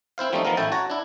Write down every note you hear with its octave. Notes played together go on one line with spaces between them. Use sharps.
C4 E4 C5 F5
F3 G3 A3 C4 C#4 D#4
D#3 F3 A#3 B3 A#4
A1 A3 E4 G5 A5
F#4 C#5 A5 A#5
D4 E4